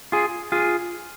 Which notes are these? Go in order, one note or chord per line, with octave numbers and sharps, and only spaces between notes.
F4 G#4
F4 G#4